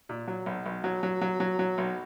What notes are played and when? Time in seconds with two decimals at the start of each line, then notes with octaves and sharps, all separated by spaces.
0.09 A#2
0.27 F#3
0.46 B1
0.66 B1
0.84 F#3
1.03 F#3
1.21 F#3
1.40 F#3
1.59 F#3
1.78 B1